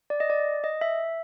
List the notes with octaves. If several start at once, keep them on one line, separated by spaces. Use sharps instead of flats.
D5
D#5
D5
D#5
E5